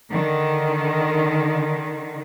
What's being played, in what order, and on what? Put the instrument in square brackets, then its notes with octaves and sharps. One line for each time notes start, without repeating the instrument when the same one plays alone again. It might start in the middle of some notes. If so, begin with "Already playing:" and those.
[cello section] D3 D#3